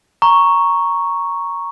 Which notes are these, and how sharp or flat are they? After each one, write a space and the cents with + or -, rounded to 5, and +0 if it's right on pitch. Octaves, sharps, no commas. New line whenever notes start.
A#5 +0 C#6 +0